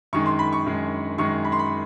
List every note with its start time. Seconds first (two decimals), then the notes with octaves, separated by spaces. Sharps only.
0.13 F#2 D#3 G#3 C#6
0.26 C6
0.39 B5
0.53 C#6
0.66 F#2 D#3 G#3
1.18 F#2 D#3 G#3 C#6
1.45 B5
1.52 C6
1.59 B5